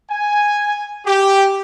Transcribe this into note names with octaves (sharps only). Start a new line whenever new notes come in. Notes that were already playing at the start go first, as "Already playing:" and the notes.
G#5
G4